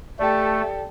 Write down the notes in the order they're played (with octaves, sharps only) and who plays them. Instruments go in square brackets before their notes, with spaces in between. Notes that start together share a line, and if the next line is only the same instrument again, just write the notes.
[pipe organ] A3 [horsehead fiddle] G4 A4 [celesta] D5 G5